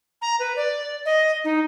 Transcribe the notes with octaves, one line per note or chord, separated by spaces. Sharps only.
A#5
B4
D5
D#5
D#4